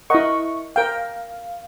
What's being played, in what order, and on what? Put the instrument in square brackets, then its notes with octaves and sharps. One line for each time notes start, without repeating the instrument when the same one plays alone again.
[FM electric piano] E4 C#6 [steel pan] A#4 D#5 F#5
[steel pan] A#4 G5 [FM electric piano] F5